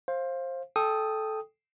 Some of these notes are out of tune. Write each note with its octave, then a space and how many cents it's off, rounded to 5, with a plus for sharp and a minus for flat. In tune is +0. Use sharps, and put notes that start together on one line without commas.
C5 +20 F5 -5
A4 -15 G5 +10 D#6 +0